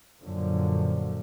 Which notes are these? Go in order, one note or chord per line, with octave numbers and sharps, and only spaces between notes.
F#2 A#2 D3 F3